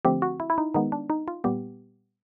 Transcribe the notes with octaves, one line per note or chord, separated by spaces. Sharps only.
D3 F3 A3 C4 G4
F#4
E4
E4
D#4
D#3 G#3 B3 D#4
D4
D#4
F4
A#2 G3 B3 G4